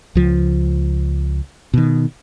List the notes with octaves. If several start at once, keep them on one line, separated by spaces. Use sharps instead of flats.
C#2 F3
B2 D#3